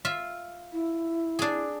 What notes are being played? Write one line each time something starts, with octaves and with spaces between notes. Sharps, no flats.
F4 E5
E4
D4 G#4